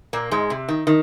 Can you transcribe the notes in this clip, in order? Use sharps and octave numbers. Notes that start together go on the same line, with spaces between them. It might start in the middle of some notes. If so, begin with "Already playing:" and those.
A#2 A#3
G#2 G#3
C3
D#3
D#3